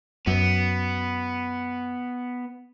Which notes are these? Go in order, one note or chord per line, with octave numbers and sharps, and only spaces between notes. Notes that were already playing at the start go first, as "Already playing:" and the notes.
F#2 B3